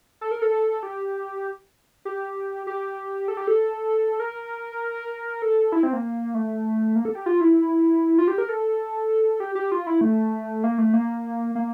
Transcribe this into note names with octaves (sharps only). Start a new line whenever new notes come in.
A4
A#4
A4
G4
G4
G4
A4
G4
A4
A#4
A4
E4
C4
A#3
A3
A#3
A4
G4
F4
E4
F4
G4
A#4
A4
G4
G4
F4
E4
A3
A#3
A3
A#3
A#3